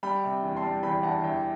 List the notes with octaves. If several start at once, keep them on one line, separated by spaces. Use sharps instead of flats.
G3 G5 B5
C3
E2
A5 C6
G3
E2 G5 B5
E2 F#5 A5
E2 E5 G5